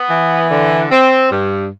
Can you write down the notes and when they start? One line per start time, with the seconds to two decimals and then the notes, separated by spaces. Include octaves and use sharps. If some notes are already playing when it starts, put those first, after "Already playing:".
Already playing: B3
0.10 E3
0.50 D3
0.90 C4
1.31 G2